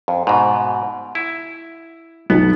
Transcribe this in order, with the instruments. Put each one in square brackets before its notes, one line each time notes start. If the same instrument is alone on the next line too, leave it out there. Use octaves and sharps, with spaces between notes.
[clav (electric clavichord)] F2
G#2 B2
E4
[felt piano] B1 D#4 [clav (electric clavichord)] B3